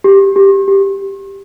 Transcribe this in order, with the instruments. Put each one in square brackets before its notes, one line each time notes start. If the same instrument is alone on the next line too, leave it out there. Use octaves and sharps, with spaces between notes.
[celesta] G4
G4
G4